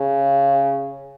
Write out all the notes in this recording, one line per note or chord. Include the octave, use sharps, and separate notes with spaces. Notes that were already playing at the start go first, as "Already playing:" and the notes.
Already playing: C#3